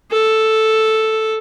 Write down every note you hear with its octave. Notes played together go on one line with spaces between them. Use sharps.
A4